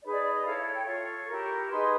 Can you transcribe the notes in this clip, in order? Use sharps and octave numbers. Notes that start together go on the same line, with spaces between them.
D#4 G#4 B4 D5
D5
D5
D#5
E4 A4 C#5 F5
G5
F4 A4 C#5 C#6
E4 G4 A#4
D#4 G#4 B4 C6